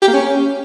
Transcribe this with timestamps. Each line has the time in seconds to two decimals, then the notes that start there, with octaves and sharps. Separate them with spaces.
0.02 G4
0.08 A#3
0.13 C#4